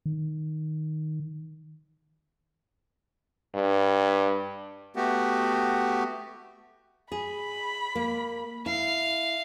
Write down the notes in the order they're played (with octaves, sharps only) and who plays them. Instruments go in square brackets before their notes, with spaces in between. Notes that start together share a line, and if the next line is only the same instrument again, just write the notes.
[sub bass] D#3
[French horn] G2
[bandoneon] A3 B3 F#4 G4
[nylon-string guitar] G#4 [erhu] B5
[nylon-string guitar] A#3
[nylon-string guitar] E4 [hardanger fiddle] F5